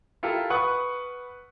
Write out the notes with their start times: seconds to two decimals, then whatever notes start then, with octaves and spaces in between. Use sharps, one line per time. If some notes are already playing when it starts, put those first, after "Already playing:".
0.23 E4 F4 G4 A4 A#4
0.50 B4 F#5 C#6 D#6